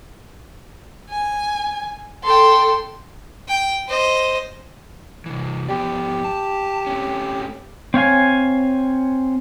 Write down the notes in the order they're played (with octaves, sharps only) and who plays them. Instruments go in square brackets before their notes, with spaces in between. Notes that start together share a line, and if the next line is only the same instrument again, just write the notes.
[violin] G#5
[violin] A4 G5 [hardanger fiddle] C6
[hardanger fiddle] G5
C5 D#5
[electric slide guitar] C3 E3
[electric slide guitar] F3 B3 D5 [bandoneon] G4
[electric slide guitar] A5
A3 C4 C#4
[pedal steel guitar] C4 C#5 F5 G#5